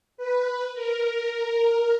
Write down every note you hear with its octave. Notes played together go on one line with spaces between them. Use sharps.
B4
A#4